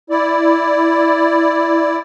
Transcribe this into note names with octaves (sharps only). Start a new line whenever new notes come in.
E4 D5